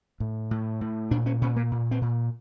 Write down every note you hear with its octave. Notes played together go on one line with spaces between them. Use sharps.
A2
A2
A2
A#2 D4
C#4
A#2 C#4
A#3
A#2
C4
A#2